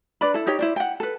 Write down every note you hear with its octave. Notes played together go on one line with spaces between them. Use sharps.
D4 B4 D5 B5
E4 A4
D#4 G4 C#5 G5
E4 C5 D5
F#5 G5
A4 B4